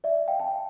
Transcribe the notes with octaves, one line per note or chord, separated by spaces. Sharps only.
D5 E5
F5 G5
G5 A5